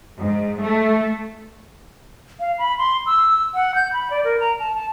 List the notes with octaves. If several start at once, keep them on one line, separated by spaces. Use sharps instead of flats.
G#2
A3
F5
B5
C6
E6
F#5
G6
B5
D5
A#4
A#5
A5
A5